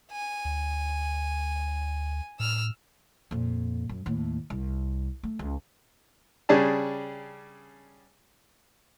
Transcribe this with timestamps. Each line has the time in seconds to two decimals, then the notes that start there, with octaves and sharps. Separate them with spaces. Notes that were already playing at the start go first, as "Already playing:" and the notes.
0.12 G#5
0.45 D2
2.40 A2 E6 F6
3.31 F2 A#2
3.89 F#2
4.06 D#2 A2
4.50 C2
5.23 A3
5.39 C#2
6.49 C#3 G3 D4 G#4 A5